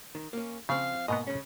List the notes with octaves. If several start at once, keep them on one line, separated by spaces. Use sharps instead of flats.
D#3
A#3 C#4
C#3 F3 C4 F5
G#2 B2 A#3 B3 D#5
C#3 G#3 C#4